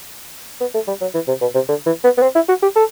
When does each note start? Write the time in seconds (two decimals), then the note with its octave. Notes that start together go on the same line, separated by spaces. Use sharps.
0.61 B3
0.74 A3
0.87 G3
1.01 F#3
1.14 E3
1.28 C3
1.41 B2
1.55 C3
1.69 D3
1.86 E3
2.04 B3
2.17 B3
2.22 C4
2.35 E4
2.48 F#4
2.62 G4
2.76 A4